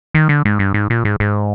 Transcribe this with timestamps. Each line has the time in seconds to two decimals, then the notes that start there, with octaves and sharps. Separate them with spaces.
0.14 D#3
0.29 D3
0.45 G#2
0.59 G2
0.74 G#2
0.90 A#2
1.05 G#2
1.20 G#2